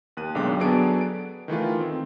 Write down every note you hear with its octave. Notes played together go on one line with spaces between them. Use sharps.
D#2 F#6 D#7
B1 F#2 D3 G#3 G5 D6
F#3 B3 D4 G#4 A4 D7
D7
D#3 E3 A3 F4
C4